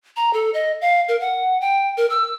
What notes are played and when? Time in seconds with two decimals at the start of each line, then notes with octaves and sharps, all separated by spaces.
0.16 A#5
0.33 A4
0.54 D#5
0.81 F5
1.08 A#4
1.20 F#5
1.61 G5
1.97 A#4
2.10 E6